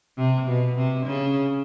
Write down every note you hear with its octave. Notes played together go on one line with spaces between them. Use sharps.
C3
B2
C3
C#3